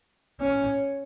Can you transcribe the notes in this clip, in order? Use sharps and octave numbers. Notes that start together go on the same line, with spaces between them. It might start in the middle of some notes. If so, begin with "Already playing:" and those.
C#4